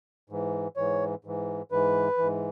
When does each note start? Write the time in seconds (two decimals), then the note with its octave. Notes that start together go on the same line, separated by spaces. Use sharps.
0.30 G#2 E3
0.76 G#2 E3 C#5
1.25 G#2 E3
1.71 G#2 E3 B4
2.18 G#2 E3